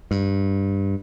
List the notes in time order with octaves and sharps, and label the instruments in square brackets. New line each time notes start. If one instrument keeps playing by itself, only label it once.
[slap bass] G2